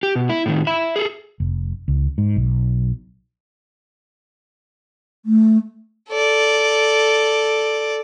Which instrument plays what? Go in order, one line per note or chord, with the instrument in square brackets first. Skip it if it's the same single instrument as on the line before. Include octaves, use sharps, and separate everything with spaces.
[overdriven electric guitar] G4
B2
E4
A2 D#3
E5 B5
G#4 A4
[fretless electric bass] F1
C#2
G#2
B1
[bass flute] A3
[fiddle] A4 D5